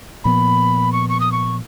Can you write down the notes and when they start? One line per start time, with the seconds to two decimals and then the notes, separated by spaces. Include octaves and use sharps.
0.24 A#2 F3 B3 B5
0.92 C#6
1.09 C#6
1.20 D#6
1.32 C#6